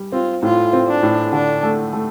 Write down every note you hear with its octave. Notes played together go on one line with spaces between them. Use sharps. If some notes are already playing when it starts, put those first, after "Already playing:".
Already playing: G3
C4 F4
A2 F4
C4
D4
A2
D3 D4
A3
A3